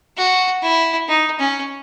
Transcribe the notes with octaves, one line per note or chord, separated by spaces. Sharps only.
F#4
E4
D#4
C#4